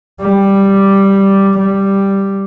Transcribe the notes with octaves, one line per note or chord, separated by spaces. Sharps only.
G3
G3